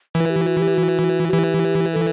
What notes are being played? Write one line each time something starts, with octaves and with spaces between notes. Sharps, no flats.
E3 B4
G4
F#4
G4
F#4
F#4
E3 G4
A4